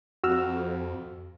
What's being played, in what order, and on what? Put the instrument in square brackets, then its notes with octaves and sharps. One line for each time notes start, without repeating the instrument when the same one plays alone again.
[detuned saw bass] F2 [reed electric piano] F#4 E6 F6